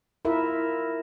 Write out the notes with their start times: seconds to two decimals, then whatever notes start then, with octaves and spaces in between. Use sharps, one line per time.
0.25 E4 F4 A#4 E5